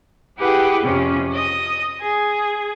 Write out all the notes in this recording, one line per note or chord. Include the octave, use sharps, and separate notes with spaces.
E4 G4 G#4 B4 F#5 G5
F2 C3 C#4
D#5 D#6
G#4